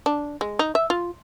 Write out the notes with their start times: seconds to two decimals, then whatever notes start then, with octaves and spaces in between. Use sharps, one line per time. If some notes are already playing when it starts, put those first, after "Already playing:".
0.06 D4
0.41 G#3
0.59 D#4
0.75 E5
0.90 F4